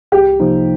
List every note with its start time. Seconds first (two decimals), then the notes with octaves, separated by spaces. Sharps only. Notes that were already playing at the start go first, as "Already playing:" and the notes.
0.12 C2 G4
0.40 C3 F3 A#3 D#4